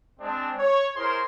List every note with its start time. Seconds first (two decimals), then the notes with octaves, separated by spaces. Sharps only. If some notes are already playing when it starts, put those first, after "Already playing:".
0.20 G#3 C4 D4
0.58 C#5
0.96 E4 G#4 A#4 C5 C#5 C6